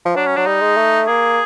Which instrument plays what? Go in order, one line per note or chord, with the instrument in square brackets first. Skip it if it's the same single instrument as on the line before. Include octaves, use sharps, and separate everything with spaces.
[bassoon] F3
[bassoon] F#3 [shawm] D4
[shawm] C#4
[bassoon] F#3 [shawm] D4
[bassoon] G3 [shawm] D#4
[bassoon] G#3
A3
[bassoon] A#3 [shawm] G#4